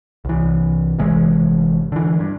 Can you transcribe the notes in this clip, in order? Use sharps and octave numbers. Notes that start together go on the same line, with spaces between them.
C2 E3
G1 C3 E3 G#3
D3 E3
G2